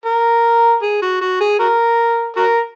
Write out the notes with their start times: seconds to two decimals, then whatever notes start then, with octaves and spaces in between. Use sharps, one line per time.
0.06 A#4
0.82 G#4
1.02 F#4
1.21 F#4
1.41 G#4
1.59 F#4 A#4
2.37 F#4 A#4